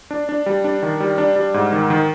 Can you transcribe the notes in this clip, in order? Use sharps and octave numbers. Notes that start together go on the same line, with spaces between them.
D4
D4
G3
D4
D#3
G3
D4
G3
G#2
D#3
D#3